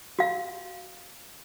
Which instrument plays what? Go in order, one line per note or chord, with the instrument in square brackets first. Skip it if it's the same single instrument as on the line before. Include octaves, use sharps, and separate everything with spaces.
[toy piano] F#4 F5